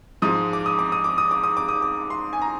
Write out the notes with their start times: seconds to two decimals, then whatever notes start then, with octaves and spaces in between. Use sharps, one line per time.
0.22 G#2 F3 G#3 D#6
0.53 D6
0.66 D#6
0.79 D6
0.92 D#6
1.04 D6
1.18 D#6
1.31 D6
1.43 D#6
1.57 D6
1.68 D#6
1.82 D6
2.10 C6
2.33 G#5
2.42 A#5